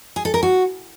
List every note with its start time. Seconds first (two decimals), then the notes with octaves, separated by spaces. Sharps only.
0.16 G#4
0.25 A4
0.34 A#4
0.43 F#4